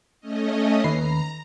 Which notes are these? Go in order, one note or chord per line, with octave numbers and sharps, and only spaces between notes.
A3 C#4 D#5
D#2 B4 A#5 C7